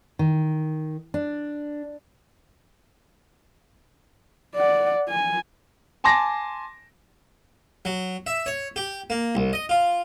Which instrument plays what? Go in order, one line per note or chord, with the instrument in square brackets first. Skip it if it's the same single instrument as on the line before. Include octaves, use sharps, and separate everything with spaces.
[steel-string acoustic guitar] D#3
D4
[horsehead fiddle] D5 F#5
G#5
[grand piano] G#5 A5 C6 D6 A#6
[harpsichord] F#3
E5
C#5
G4
A#3
C2
D#5
F4